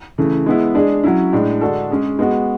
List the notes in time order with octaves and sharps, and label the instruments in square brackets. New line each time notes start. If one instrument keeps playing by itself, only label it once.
[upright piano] C#3 E3 A3
G#3 B3 E4
G#3 D4 G#4
F#3 C#4 E4
A2 G#3 D4
D3 G#3 D4 F#4 A4
G#3 C#4 G#4
G#3 B3 F#4